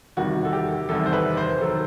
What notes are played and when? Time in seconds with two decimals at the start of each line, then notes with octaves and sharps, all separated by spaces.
0.17 E2 C3 D#3 G3 F#4
0.45 A4
0.53 G4
0.89 E2 C3 D#3 G3 A4
1.06 C5
1.13 B4
1.37 C5
1.61 D#3 F#3 A4